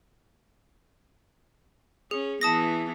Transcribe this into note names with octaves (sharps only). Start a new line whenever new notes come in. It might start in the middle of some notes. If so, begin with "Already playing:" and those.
C#4 G#4
E3 B3 E4 A5 D#6 A#6